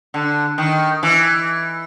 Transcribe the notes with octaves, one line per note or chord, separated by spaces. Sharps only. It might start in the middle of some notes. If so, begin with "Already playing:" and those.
D3
D#3
E3